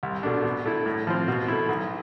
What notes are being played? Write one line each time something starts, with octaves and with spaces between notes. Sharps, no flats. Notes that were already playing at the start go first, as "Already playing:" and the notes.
C2
B2 A3 D4
B2
A3 E4
A2
F3 C4
B2
A3 E4
B1